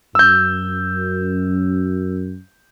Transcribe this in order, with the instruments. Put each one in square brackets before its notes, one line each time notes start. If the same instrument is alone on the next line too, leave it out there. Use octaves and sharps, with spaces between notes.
[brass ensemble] F#2 [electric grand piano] E6 G6